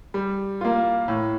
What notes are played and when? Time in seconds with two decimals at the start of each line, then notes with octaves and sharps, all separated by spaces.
0.14 G3
0.61 A#3 F4
1.08 A2